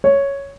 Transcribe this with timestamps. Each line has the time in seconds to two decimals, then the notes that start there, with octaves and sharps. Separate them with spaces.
0.04 C#5